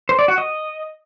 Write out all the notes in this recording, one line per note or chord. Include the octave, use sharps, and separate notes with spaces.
C5
D5
F#4
D#5